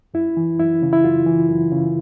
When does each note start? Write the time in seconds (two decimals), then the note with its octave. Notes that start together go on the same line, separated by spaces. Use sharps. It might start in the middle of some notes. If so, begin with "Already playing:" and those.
0.14 F#2 E4
0.37 E3
0.59 F#2 E4
0.82 C#3
0.93 E4
1.04 F#2 F4
1.26 E3
1.49 F#2
1.72 C#3